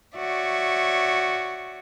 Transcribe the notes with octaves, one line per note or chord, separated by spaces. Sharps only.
F#4 C#5 D5 E5